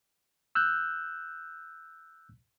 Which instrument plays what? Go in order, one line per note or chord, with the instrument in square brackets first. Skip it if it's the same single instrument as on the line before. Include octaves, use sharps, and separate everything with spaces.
[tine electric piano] E6 F#6 G6